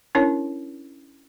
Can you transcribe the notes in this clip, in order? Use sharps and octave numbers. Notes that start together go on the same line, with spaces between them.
C#4 D4 E4 A#4 C#5